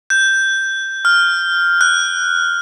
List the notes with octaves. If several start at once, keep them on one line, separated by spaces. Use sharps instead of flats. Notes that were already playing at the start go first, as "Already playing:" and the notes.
G6
F6
F#6